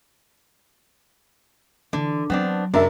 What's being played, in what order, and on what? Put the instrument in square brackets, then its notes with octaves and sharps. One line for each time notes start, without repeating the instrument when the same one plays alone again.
[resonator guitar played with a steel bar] D3 [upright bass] E3
[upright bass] F#3 [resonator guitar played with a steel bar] B3 C4 D4
[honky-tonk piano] F#1 A#4 E5 [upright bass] F#2 [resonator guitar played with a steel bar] D4